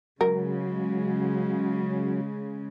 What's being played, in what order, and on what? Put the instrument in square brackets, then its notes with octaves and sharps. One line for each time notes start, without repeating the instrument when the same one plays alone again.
[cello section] C#3 G#3 [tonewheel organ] F#3 [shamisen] A#4